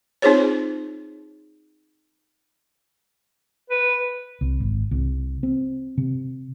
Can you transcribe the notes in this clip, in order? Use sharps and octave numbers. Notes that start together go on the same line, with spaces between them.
C4 D#4 F4 G#4 C5 C#5
B4
C2
G#1
C2
C4
C3